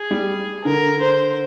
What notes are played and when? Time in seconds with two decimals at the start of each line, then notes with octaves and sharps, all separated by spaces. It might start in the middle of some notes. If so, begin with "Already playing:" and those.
Already playing: G#4
0.11 G3
0.64 D3 A#4
1.01 C5